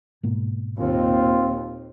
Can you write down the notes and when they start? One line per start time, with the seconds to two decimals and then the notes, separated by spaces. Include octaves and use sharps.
0.23 G#2 B2 A#3
0.79 D#2 A#2 C4 F4